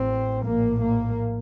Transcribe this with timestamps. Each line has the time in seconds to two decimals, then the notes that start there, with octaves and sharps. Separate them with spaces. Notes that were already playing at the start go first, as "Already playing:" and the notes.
Already playing: A1 A2 C4
0.45 A#1 A2 A#3
0.82 A#3